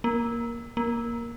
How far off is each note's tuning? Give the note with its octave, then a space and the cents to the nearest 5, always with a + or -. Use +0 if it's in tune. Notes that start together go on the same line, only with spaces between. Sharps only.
A#3 +10
A#3 +10